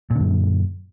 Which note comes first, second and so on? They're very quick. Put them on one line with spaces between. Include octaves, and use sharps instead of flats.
A#2 D3 F#2